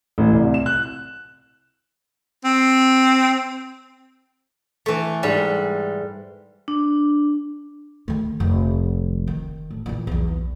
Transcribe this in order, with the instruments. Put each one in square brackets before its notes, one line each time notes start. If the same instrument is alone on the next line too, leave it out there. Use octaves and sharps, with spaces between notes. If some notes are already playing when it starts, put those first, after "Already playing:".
[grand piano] A1
C2
E7
F#6
[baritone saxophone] C4
[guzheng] E3 A3
G#2 G3
[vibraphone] D4
[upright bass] D#3 A3
F1 D#3
D#3
A2
A#2 E3
B1 E2